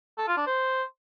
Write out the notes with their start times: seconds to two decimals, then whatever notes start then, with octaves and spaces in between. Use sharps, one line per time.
0.18 A4
0.28 F4
0.37 D4
0.47 C5